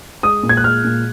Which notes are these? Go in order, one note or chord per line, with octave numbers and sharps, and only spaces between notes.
G#3 D#6
A#2
G#6
F#6
G#3 F6
A#2